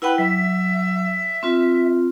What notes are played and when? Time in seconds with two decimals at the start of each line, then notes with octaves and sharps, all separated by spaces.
0.02 E4 B4 F#5 G5
0.18 F#3 E5
1.43 C4 F4